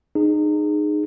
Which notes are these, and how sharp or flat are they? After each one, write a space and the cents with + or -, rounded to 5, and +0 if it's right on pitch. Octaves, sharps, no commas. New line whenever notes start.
D#4 -30 G#4 +0